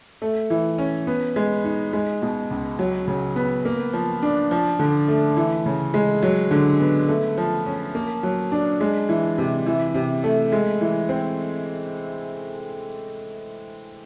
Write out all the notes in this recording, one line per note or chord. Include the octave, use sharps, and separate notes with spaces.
A3
E3
C#4
B3
G#3
D#4
G#3
B2
C#2
F#3
C#3
B3
A#3
F3
D4
F3
D3
A3
E3
C#3
G#3
F#3
D3
B3
A3
F3
C#4
A#3
F#3
D4
G#3
E3
C3
E3
C3
A3
G#3
E3
C4